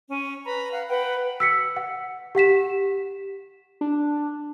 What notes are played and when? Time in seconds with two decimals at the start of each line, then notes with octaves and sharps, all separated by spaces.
0.09 C#4
0.45 B4 A#5 B5
0.72 F5 F#5
0.88 B4 F#5 G5
1.40 E6 B6 C#7
1.77 F#5
2.35 G4 F#5 B6 E7
3.81 D4